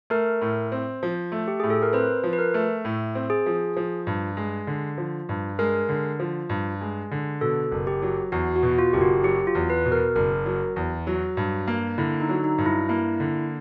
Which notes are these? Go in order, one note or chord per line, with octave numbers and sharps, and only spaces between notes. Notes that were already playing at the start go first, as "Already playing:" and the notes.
A3 A#4
A2
C4
F3
A3
G4
A2 G#4
A4
A#4
C4 B4
F3
B4
A#4
A3
A2
C4
G#4
F3
F3
G2
G#3
D3
F3
G2
G#3 A#4
D3
F3
G2
G#3
D3
B2 A4
F#1
G4
F#3
E2 F#4
F#4
B2
F4
F#1 G4
F#4
F#3 G4
F4
E2
B4
B2
A#4
F#1 A#4
F#3
E2
F#3
G2
A#3
D3 E4
D#4
F#3
D#4
G2
E4
A#3 E4
D3